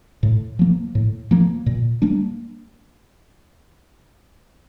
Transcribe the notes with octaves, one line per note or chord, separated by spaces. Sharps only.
A2
F3 A#3
A2
F3 A#3
A#2
G3 A#3 D4